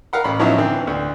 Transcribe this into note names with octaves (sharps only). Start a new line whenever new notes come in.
A#4 F5 F#5 B5
A1 B5
F3 F#3 B3 C#4 D#4 E4
D3 E3 C4
D2